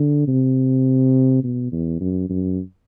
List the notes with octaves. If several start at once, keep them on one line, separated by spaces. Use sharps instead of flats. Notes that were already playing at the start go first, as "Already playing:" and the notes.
Already playing: D3
C3
B2
E2
F#2
F#2